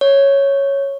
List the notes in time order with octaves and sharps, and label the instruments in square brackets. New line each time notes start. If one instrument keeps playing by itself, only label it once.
[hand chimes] C#5